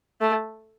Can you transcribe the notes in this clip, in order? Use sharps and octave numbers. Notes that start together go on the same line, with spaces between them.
A3